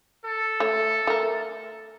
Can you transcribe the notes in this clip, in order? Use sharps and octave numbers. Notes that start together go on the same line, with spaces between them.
A4
A3 C#5
A3 A#4